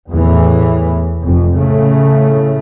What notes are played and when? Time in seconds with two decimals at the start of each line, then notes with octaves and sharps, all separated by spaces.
0.10 E2 A2 E3
1.21 F1 F2
1.56 A2 C#3 A3